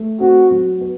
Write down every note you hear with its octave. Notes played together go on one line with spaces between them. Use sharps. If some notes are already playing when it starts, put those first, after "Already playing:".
Already playing: A3
C4 F#4
F#3
B3